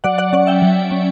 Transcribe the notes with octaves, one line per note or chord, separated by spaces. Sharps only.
F#3 D5 F#5
D5 F#5
C#4 D5 F#5
E5 G5
F#3
C#4